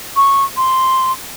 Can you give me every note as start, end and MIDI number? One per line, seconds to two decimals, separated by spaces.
0.16 0.45 85
0.57 1.12 84